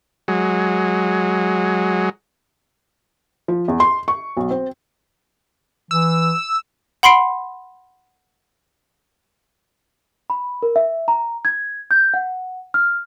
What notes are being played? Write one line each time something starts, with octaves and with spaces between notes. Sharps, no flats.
F#3 G#3
F3
E2
C6
C#6
B1
C4
E3 E6
F#5 B5 C6 C7 D7
B5
A#4
E5
A#5
G#6
G6
F#5
F6